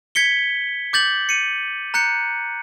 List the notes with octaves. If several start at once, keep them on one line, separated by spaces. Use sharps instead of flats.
G#6 B6 C#7 G7
D6 G6 A6 F#7
C#7 D#7
A#5 F#6 G6 C#7